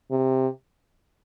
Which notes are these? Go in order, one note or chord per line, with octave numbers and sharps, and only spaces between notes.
C3